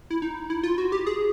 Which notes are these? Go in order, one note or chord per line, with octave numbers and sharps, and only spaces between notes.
E4
D#4
E4
F4
F#4
G4
G#4